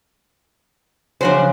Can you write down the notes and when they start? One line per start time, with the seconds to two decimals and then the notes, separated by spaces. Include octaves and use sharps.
1.21 C#3 F3 D4 F#4 C5